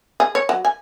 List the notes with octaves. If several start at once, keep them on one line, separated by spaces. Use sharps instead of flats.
G#4
C#5
F#3
G#5